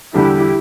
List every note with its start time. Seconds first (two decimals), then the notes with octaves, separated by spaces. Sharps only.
0.13 E2 D3 G3 D4 E4 G4 A4